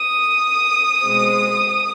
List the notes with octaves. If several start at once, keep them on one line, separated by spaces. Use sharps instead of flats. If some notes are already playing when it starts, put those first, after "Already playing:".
Already playing: D#6
B2 G#3 C4